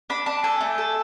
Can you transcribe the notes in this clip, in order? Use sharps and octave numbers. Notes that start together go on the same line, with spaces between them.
D4 B5
D4 A5
A4 G#5
A3
A4